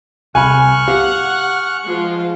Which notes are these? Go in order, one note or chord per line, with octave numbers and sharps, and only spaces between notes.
C2 F5 G#5 B5 C#6 F6 F#6
G4 F5 F#5
F3 G#3 F4